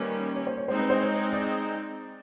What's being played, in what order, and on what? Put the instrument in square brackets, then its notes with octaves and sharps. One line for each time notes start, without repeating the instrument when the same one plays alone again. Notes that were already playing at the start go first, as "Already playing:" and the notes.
Already playing: [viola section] D#3 G3 A#3 C#4 [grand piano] B4
[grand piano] C#5
C5
C#5
[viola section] G#3 C4 D#4 [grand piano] C5
[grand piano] B4
C5
C#5
D5